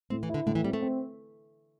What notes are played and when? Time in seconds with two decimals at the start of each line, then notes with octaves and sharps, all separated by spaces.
0.10 A2 C4
0.23 E3
0.29 E4
0.34 D3
0.46 A2 D3
0.55 E3
0.64 G3 C4
0.73 A3
0.82 C4